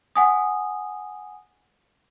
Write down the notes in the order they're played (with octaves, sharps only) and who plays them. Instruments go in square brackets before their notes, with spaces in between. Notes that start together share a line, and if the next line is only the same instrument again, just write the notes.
[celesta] F#5 G#5 D#6